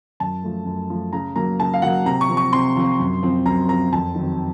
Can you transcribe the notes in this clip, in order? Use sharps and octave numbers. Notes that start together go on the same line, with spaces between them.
F#2 A5
F3 A3
F#2
F3 A3
C#3 A#5
F#3 A#3 A#5
C#3 A5
F5
F#3 A#3 F#5
C3 A#5
C#6
F3 C4
C#6
C3 C6
F3 C4
F#2
F3 C4
F#2 A#5
F3 C4 A#5
F2 A5
D#3 F#3 C4